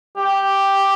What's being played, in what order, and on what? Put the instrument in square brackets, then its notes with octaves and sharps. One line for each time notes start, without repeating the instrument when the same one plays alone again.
[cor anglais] G4